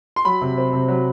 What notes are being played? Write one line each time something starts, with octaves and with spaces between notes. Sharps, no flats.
C6
F#3 B5
C3
C4
C3
F#3